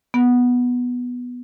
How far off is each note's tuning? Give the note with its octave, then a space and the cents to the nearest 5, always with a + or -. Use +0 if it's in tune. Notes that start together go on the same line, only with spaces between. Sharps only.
B3 -5